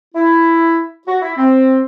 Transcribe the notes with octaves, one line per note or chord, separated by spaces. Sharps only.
E4
F#4
E4
C4